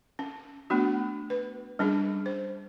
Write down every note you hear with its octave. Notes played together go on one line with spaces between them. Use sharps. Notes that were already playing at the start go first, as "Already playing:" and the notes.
C#4
A3 B3 D4 F#4
B4
G3 C#4 D4 G#4
C5